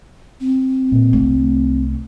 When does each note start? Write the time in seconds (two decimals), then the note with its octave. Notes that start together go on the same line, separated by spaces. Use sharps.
0.40 C4
0.91 A#2
1.13 C2 A3